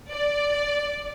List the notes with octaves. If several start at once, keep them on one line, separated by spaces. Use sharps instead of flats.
D5